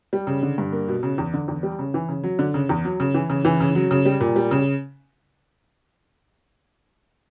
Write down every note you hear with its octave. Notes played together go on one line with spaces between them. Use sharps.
G3
C#3
D3
G2
A#3
B2
C#3
E2
D3
E2
G3
C#3
E3
C#3
F#3
D3
C#3
E2
F#3
C#3
E3
C#3
E3
C#3
F#3
C#3
G3
A#2
G3
C#3